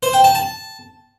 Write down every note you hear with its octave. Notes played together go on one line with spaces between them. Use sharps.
C5
G5
A5
A5